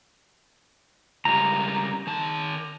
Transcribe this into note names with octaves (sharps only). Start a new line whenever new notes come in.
C#2 G3 A#5
D#3 A5